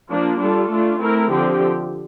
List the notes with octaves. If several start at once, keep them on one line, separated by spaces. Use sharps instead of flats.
F3 A#3 D4 F4
G3 D4 F4 A4
A3 D4 F4
A3 C4 E4 A#4
D3 F3 C4 G4